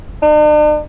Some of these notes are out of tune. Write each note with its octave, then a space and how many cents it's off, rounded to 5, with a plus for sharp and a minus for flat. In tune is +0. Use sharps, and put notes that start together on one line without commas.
D4 +45